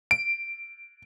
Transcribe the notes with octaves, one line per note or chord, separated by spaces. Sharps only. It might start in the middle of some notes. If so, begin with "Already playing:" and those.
D7